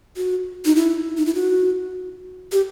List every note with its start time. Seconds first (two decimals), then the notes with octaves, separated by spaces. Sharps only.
0.17 F#4
0.65 D#4
0.76 E4
1.17 D#4
1.26 E4
1.35 F#4
2.52 G4